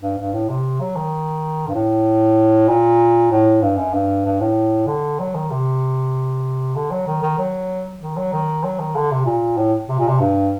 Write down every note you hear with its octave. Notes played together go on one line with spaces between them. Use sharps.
G2
G2
A2
C3
F#3
D#3
G2
A2
A#2
A2
G2
F#2
G2
G2
A2
D3
F#3
D#3
C3
D3
F#3
D#3
D#3
F#3
D#3
F#3
D#3
F#3
D#3
D3
C3
A#2
A2
C3
A#2
C3
G2